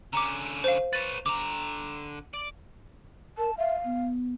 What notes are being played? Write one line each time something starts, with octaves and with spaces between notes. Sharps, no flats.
D3 C#4 A#5 D6
C5 F5
B4 C#5 A6
D3 A#5 D6
D5
A#4 A5
E5 F5
B3